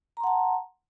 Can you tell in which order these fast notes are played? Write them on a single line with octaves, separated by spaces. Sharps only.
A#5 C6 F#5 A5